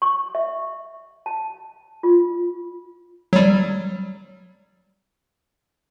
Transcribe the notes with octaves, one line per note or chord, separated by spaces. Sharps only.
C#6
E5
A5
F4
F#3 G3